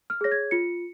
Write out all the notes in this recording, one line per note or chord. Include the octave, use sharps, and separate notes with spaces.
F6
G#4 C#5 A#6
G#6
F4 C#7